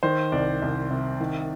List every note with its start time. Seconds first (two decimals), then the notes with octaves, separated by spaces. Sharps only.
0.03 D#3 C5
0.32 C2 D5
0.62 C2
0.90 C3
1.20 D#3